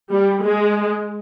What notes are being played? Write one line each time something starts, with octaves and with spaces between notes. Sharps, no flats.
G3
G#3